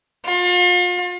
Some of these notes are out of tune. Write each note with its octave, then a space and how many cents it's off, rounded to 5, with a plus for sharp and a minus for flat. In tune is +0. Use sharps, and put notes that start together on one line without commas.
F4 +40